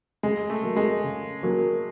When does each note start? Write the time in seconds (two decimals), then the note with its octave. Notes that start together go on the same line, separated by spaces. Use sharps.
0.23 C#3 G#3
0.50 A3
0.63 F#3 A#3
0.76 G#3
1.04 C#3
1.43 F#3 A#3